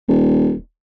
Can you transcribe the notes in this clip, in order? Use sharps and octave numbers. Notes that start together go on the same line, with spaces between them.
D#1